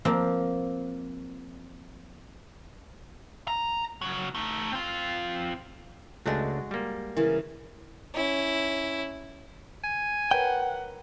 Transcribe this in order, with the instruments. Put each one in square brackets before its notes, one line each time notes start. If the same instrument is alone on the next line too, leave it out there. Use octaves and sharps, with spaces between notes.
[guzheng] F3 A#3 C4
[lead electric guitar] A#5
C#3 F#3
A3 D#4
C4 F4
[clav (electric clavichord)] C#2 A3 D4 [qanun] G#3 F#4
[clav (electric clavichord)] G3 A#3
[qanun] C#3 E3 [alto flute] A#4
[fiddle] C#4 E4
[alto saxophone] G#5
[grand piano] A#4 B4 C#5 [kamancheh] F#5 [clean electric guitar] G5